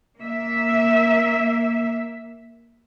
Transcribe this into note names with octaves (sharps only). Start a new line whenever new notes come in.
A#3 E5